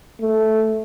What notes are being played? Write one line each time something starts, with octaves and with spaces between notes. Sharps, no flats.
A3